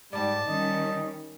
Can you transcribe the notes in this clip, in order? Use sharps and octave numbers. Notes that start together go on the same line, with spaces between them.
G#2 G3 D5 A5
D#3 G3 C#4 D#5